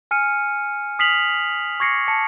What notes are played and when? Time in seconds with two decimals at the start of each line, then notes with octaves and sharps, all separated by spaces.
0.11 G#5 F6 C#7 D#7
0.99 D#6 F6 B6 C7 F7 F#7
1.80 C#6 D6 G#6 A#6 C7 C#7
2.08 A5 C#7